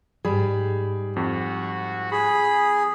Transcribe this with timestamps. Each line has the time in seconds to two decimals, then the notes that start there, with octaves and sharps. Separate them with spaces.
0.25 G#2 G3 G#4 B5
1.16 F2 F#4
2.12 G#4 B5